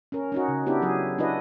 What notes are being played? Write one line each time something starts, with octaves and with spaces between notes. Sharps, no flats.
C#4 A#4
C#4 D#4 F#4
C#3
B3 D4 E4 G4
F#3 G#4
D4 E4 F#4 B4 D#5